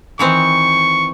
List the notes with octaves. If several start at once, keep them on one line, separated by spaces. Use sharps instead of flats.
D#3 E3 C4 C#6